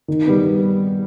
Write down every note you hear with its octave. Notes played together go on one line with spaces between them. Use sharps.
D#3
G3 B3